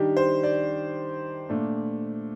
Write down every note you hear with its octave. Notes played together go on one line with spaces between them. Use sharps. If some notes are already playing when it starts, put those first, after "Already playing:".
Already playing: D#3 G3 D4 G4
C5
D5
A#2 A3 D4